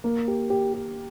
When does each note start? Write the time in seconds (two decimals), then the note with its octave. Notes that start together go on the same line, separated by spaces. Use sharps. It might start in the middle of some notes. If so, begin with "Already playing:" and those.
0.04 A#3
0.28 G4
0.50 G4
0.74 G4